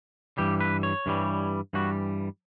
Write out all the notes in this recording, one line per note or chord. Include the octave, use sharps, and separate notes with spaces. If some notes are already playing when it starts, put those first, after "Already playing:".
G2 E3 G3 G4
B4
C#5
G2 E3 G3
G2 E3 G3 F#4